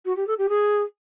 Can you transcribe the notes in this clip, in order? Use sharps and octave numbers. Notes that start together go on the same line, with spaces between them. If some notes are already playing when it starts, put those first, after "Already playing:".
F#4
G4
A4
G4
G#4